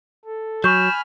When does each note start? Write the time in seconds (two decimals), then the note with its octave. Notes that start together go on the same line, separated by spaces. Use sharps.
0.25 A4
0.64 F#3 G#5 B5 C#6 F6 G6 E7